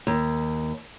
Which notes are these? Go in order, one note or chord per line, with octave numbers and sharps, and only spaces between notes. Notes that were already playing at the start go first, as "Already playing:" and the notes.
D#2